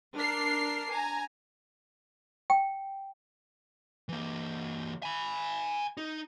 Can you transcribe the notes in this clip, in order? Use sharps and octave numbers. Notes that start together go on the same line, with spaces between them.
D4 A#4 F6 C7
G#5 A#5
G5
E3 A#3
G#5 B5
D#4